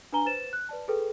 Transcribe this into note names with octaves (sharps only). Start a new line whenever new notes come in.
D4 B4 G#5 A#5 G7
B4 C5 A6 E7
F#6
B4 D5 A5
G#4 A4 B4 G5